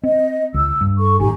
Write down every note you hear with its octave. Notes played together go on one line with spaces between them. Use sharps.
C4 D#5
C#2 E6
G2
A4 C#6
G#1 A2 D#4 G4 G#5